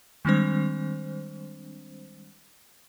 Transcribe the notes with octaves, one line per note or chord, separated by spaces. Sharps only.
D#3 G3 G#3 C4 D4 C5